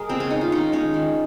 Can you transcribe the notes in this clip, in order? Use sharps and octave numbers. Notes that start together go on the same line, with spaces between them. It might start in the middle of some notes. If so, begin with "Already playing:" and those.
Already playing: G#3 G#4 A#4
C#3 C4
C#4
G#3 D#4
F4
D#3 D#4
G#3 C#4
D#3